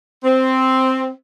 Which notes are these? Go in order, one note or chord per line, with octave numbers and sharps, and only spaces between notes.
C4